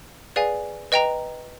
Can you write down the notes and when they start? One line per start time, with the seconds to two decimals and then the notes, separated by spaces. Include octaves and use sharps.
0.36 G#4 B4 D5 F5 G#5
0.92 B4 D#5 G5 A#5